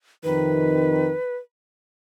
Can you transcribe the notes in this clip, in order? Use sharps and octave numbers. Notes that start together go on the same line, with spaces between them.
F2 C3 D#3 B4